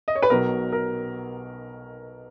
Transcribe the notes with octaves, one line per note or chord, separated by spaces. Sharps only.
D#5
C#5
B4
B1 B2 F#3 A#4
A#4